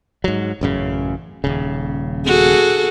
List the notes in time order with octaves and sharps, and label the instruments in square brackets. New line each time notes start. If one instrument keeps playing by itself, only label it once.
[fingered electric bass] G#2 F#3
A1 F#2 C#3
D#1 C#3
[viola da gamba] F#4 G#4 A4